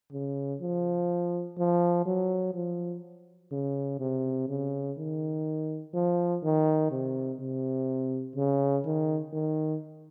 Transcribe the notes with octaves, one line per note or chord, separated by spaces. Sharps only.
C#3
F3
F3
F#3
F3
C#3
C3
C#3
D#3
F3
D#3
C3
C3
C#3
D#3
D#3